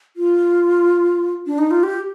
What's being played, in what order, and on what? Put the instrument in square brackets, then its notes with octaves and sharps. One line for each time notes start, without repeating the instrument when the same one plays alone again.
[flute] F4
D4
D#4
F4
G4